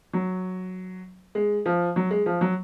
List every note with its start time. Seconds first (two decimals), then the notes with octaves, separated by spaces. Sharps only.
0.13 F#3
1.35 G#3
1.66 F3
1.96 F#3
2.11 G#3
2.26 F3
2.41 F#3